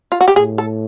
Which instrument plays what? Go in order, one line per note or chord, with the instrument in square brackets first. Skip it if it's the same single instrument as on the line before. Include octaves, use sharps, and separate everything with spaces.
[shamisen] F4
F#4
G4
[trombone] A2 [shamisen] G#4
[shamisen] A4